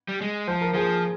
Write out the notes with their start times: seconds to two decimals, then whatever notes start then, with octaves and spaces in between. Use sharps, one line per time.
0.08 G3
0.21 G#3
0.48 F3 C5
0.61 A#4
0.74 F3 G#4 C5